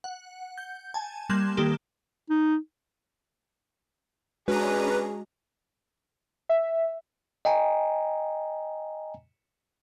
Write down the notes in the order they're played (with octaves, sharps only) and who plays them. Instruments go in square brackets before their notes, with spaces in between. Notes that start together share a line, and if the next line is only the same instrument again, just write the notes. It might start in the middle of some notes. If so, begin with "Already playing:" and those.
[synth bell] F#5
G6
G#5 A5
G3 A#3 C6 F#6 G#6 E7
D#3 A#3 G4 A4
[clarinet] D#4
[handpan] G#3 F#4 [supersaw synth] C#4 D4 A#5 [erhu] G#4 [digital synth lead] B4
[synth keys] E5
[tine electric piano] D#5 G5 G#5 A#5